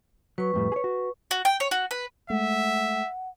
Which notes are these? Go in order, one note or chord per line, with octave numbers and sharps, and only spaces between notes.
F#3 B4 C#6
F2 A2 G3
G#4 C#5
F#4
F#4
G5
C#5
F#4
B4
G#3 A3 E5 F#5